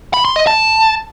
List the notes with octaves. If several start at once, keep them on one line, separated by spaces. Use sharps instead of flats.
B5
C6
D#5
A5